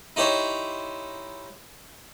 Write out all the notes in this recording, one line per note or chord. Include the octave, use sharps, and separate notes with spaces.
D#4 E4 G4 C5 C#5